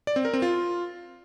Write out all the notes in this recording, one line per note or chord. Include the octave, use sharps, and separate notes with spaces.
D5
C4
A#4
C4
F4